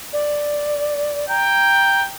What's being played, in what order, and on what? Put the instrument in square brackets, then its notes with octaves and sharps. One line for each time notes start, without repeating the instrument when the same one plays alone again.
[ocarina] D5
[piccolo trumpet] G5 [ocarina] A#5